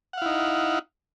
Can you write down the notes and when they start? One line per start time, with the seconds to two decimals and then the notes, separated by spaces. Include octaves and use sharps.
0.13 F#5
0.17 F5
0.22 E4
0.26 D#4